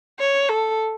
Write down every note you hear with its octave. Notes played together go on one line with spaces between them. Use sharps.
C#5
A4